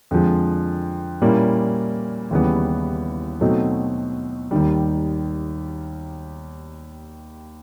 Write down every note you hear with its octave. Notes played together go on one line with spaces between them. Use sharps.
F2 D3 F3 G#3
A#2 G3 A#3 C#4 E4
D#2 C#3 E3 G3 B3
B2 F#3 A3 C4 D#4
D#2 D#3 G3